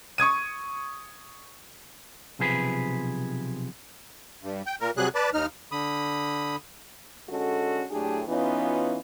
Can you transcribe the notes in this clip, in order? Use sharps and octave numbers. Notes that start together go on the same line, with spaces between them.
C#6 D#6 G#6 D#7
B1 C3 F3 G#4 B4
G2
G5
A#2 A#4
C3 F#3 G3 G#4 F#6
B4 D5 A5
D#2 D#4 F6
D3 B5 D#6
D3 G#3 C#4 F#4 A4
A2 F#3 A3 D4 G4 G#4
E3 B3 C#4 D#4 F4